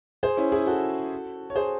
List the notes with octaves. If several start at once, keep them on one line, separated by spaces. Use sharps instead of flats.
G#4 C5
C#4 E4
E4 G#4
F#4 A4
C#5
G#4 C5